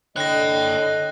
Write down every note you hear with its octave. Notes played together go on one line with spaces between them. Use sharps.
D3 C#5 D#5 G5 F#6 A#6